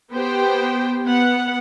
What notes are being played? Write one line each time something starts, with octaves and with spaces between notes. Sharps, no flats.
B3 G4 C5 G5
B3 F#5